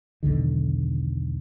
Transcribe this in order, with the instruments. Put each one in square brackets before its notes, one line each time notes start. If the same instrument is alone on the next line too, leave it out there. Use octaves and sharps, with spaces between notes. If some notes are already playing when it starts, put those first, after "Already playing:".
[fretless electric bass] B1 E2 D3 D#3